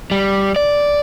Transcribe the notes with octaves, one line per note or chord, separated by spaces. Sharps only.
G3
D5